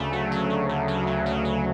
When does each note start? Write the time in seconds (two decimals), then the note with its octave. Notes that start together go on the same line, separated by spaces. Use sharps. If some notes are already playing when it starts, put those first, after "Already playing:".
Already playing: D2 C#3 A3
0.12 F#3
0.31 C#3
0.50 C#3
0.69 D2
0.88 F#3
1.07 C#3
1.26 F#3
1.45 F#3